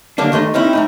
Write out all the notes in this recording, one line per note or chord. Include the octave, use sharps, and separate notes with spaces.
D#2 D3 A#3 D4
D#3 A3 D#5 C6
C4 C#4 D#4 E4
A3 A#3 D#4